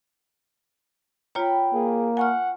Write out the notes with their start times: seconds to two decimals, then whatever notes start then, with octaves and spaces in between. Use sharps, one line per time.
1.35 F4 C#5 G5 A#5 B5
1.74 A#3 G#4
2.17 F#5 G#5 C#6 F6